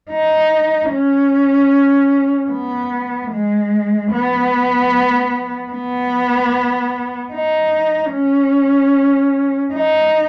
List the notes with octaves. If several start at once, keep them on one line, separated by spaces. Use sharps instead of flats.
D#4
C#4
B3
G#3
B3
B3
D#4
C#4
D#4